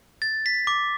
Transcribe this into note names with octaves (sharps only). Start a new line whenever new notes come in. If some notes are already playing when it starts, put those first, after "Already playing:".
A6
B6
D6